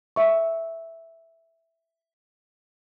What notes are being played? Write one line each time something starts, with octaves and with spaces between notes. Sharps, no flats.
E5 C#6